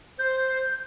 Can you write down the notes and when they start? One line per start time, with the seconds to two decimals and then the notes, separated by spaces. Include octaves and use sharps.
0.18 C5 G6